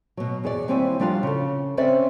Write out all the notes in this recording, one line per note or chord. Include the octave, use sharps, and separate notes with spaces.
B2 F#3
E2 G#4 C#5 D5
D#2 G3 C4 E4 C#5 G#5
F3 G3 D4 F4 F#4 F5
C#3 A4
C4 C#4 C5 D5 E5